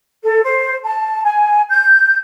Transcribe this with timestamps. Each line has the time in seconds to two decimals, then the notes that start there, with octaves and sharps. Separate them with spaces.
0.23 A4
0.43 C5
0.84 A5
1.24 G#5
1.70 G6